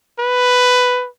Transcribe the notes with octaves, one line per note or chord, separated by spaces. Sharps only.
B4